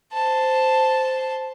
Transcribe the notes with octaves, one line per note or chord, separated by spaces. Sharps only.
C5 A5